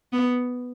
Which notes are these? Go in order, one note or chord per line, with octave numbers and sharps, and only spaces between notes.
B3